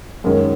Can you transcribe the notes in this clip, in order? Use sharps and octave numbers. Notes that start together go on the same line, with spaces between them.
F#2 D#3 G#3 C#4